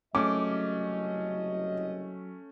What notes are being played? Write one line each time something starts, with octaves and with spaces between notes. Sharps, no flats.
F#1 C2 F#3 A3 C#4 D#5 D6